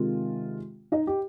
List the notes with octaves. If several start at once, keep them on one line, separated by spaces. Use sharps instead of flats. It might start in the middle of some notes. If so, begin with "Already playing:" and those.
Already playing: C3 D#3 G#3 F4
D#4 D#5
G4